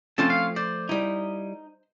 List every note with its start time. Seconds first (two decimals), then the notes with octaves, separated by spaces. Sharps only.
0.18 F3 A3 C4 C#4 F4 A5
0.30 F5
0.56 C5 D5
0.89 G3 D#4 E4